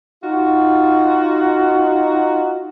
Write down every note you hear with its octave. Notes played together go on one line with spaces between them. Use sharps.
D#4 F4 F#4